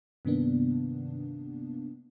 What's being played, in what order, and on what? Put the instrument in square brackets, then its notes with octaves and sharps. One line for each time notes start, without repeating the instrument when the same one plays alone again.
[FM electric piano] G2 C3 D#3 A#3 B3 D4